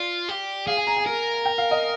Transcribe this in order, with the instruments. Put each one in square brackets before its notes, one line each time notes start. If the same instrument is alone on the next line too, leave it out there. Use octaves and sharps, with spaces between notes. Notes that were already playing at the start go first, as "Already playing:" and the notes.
Already playing: [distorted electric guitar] F4 [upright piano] D5
[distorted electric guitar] G4
[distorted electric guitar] G#4 [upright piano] F5
[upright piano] G#5
A#5
G#5
[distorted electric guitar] A#4
[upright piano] G5
F5
D#5